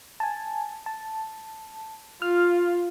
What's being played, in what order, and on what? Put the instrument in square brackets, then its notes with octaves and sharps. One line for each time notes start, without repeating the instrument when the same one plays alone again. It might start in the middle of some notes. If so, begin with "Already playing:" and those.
[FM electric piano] G#5 A5
A5
[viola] F4 [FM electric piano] F6